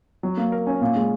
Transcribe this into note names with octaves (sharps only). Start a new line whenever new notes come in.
F#3
A#3
A#4
C#4
A#2
G#3